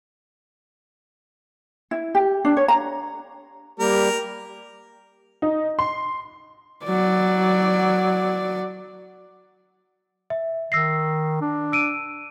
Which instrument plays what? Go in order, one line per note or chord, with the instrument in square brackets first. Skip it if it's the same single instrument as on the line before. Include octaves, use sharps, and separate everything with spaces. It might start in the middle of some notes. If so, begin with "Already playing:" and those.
[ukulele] E4
G4
D4
C#5
A#5
[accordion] G3 A#3 G4 [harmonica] A#4
[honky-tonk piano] D#4
C6
[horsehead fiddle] F#3 D5
[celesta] E5
[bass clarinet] D#3 [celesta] E6 A#6 C7
[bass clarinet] D4
[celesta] E6 D7 D#7